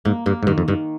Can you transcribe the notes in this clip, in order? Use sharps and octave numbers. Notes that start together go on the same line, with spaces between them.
G#2 A#3
G2 A#3
G#2
G2 D#3
F2
G2 D#3